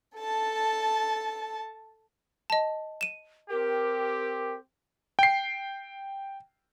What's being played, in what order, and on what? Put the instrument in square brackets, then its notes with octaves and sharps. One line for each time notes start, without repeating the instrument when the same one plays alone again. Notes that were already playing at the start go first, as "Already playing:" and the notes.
[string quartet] A4 A5
[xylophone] D#5 A5
D#7 E7
[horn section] C4 G4 [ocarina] A#4
[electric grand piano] G5 C7